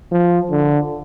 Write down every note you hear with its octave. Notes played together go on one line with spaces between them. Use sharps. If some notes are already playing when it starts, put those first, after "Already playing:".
F3
D3